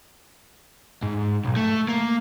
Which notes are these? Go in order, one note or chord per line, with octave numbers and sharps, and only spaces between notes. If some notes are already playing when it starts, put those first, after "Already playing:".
G#2
B1
A3
A#3